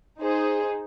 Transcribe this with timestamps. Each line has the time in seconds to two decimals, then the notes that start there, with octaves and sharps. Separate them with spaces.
0.20 D#4 G#4 C5